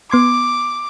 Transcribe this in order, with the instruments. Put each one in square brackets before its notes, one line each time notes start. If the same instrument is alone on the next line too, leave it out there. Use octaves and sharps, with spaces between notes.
[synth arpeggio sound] B3 C6 G#6 [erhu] D6